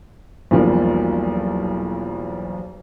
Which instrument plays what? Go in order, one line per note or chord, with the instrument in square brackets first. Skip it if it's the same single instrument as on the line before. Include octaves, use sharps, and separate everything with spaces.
[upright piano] B1 E2 F3 G3 A#3